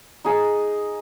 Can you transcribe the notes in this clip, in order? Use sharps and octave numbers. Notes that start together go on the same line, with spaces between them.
D#4 G#4